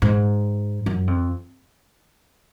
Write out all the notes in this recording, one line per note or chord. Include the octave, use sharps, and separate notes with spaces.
G#2
F#2
F2